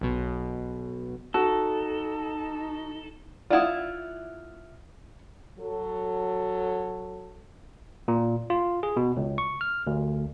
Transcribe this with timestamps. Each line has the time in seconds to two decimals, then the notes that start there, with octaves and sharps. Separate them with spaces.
0.01 B1 B2
1.34 D#4 F#4 A4
3.50 E4 F4 D5 F#5 D#6
5.59 F#3 A4
8.08 A#2
8.50 F4
8.83 G#4
8.96 B2
9.17 C#2
9.38 C#6
9.61 F6
9.87 D2